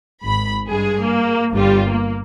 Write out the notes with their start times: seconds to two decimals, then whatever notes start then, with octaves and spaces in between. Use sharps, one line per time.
0.23 G#1 B5
0.69 G2 G#3 G#4
1.00 A#3
1.54 G1 G3 F4
1.88 A#3